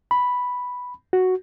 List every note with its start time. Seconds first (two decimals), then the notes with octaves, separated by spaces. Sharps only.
0.11 B5
1.13 F#4